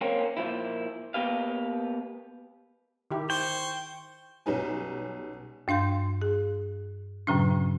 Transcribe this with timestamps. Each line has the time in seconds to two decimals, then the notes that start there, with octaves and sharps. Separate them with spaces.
0.01 A#3 C4 C#4
0.37 A#2 F3 E4
1.14 A#3 B3 G4 B4 F5
3.11 D#3 E4 G4
3.30 C5 G5 C6 C#6
4.46 B1 G3 C#4 D#4 B4 G#5
5.68 G2 D4 F5 C6 G6
6.22 G#4
7.27 G2 A#2 C#3 F#3 C#4 D4